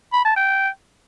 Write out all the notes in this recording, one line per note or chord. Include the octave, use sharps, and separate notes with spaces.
B5
A5
G5